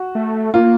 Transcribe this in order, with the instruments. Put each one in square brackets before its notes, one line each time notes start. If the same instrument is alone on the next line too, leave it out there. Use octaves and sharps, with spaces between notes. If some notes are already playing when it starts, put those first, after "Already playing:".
Already playing: [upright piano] F#4
[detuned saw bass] A3
[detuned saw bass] A#3 [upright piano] F4